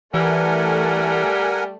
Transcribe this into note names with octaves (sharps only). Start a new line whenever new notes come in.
E3 G3 A3 A#4 D5 F#5 G#5